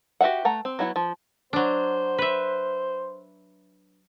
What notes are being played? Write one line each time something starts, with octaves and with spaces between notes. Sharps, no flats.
F#4 G4 B4 E5 F#5
A3 F#5 A#5
C4
F#3 B3 E4 F#5
F3
F#3 D4 C5
B4 E5